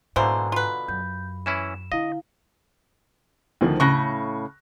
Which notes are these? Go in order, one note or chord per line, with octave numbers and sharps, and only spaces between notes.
G#2 B2 D3 A#3 E4 C5 G#5 A#5
F4 B4
F#2 G6
E3 C#4 E4 E7
D3 E4 D#5 F5
D2 D#3 F3
A2 C#3 C#6 F#6 A#6